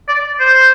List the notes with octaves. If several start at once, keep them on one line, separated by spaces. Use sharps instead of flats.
D5
C5